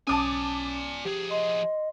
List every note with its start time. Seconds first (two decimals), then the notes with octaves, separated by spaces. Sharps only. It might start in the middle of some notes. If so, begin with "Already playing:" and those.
0.07 B1 C#4 D5 G#5 A5 D6 D#6
1.05 F3 G4 G#4
1.31 D#5 C6